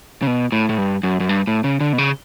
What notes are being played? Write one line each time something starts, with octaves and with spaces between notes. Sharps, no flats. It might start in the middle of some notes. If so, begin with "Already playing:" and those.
C#3
B2
A2
A2
G2
F#2
F#2
G2
A2
C#3
D3
B2
C#3